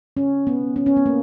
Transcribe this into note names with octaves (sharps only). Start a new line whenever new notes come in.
C#4
B3
C#4
C#4
B3
A#3